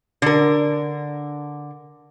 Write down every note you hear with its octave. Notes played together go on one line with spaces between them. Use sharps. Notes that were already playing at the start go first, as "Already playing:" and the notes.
D3 A#4